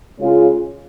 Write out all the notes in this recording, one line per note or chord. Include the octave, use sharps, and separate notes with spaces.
C#3 G#3 C#4 F4 G#4